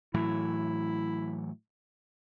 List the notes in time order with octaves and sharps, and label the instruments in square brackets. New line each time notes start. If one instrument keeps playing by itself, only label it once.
[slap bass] A2 E3 F#3 [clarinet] E4